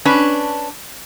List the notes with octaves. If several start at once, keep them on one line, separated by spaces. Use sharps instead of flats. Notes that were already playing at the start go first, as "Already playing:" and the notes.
C#4 D4 B4